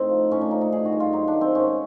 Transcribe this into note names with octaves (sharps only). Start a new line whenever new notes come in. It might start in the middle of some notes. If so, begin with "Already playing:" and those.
Already playing: A2 C4 D#4
F3
A2 C#4
D4
F3 D#4
D#4
G2 G#4
F#4
G2
F4
F#3 D#4
D4
D#3
C4
G#2 C#4